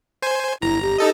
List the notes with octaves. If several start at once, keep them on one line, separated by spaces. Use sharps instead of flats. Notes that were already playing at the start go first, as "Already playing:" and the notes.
C5 G#5
G1 E4 A#5
G4
D#4 A4 D#5